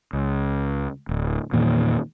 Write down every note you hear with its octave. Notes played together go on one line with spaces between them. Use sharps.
C#2
D1
E2 A#2 D#3